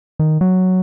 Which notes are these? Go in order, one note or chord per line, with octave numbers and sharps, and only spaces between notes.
D#3
F#3